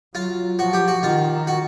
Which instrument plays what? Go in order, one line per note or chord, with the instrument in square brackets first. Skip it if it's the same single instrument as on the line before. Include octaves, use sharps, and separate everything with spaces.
[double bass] F#3 [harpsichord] F4
[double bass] F3 [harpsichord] F#4
[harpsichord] G4
F#4
[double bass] D#3 [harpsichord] F4
[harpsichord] F#4